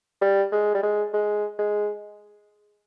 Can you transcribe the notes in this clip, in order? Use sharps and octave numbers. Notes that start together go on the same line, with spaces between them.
G3
G#3
G3
G#3
G#3
G#3